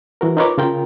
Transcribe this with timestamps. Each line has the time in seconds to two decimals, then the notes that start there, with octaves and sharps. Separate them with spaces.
0.21 E3 F#4 A#4
0.37 D#4 F4 A#4 B4 C#5 D6
0.58 C#3 F4 A#4 G5